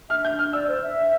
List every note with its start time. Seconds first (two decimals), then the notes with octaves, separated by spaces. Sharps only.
0.10 E5 F6
0.25 G6
0.39 F6
0.53 D5 E6
0.68 C5
0.83 E5